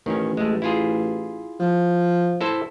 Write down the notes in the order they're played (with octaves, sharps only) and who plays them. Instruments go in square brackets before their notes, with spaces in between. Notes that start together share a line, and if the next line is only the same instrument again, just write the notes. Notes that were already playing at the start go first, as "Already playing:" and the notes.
[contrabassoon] A1 [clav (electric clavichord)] D#3 C#4
[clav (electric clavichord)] G#3 A3
E4 F4 G#4
[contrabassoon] F3
[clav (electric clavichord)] E4 A4 C5